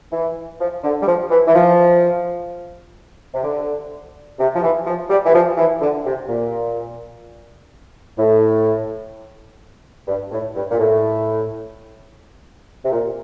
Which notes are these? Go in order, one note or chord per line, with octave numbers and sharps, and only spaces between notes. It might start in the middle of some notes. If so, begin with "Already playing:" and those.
E3
F3
D3
G3
F3
E3
E3
F3
C3
D3
C3
F3
E3
F3
G3
E3
F3
E3
D3
C3
A#2
A2
G2
A2
G2
A#2
A2
C3
A#2